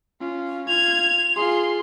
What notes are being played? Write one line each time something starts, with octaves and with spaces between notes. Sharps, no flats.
C#4 F4
F4 G#6 F7
F4 G#4 C6